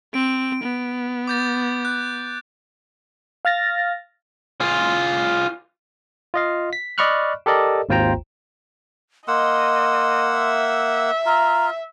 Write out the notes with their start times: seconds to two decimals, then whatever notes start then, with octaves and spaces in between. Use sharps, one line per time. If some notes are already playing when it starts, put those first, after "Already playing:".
0.14 C4 D7
0.63 B3
1.27 D6 G6 A6
1.85 F#6
3.45 F5 F6 A6 A#6
4.61 F4 G#4
6.34 F4 D#5 F5
6.73 B6
6.98 D5 D#5 B5 C#6 F6 F#6
7.46 G4 A4 A#4 D5 D#5
7.89 G#1 D#2 F4 C5 G5 A#5
9.28 A#3 D#5 F#5 C6 E6
10.38 E5
11.26 F4 A#5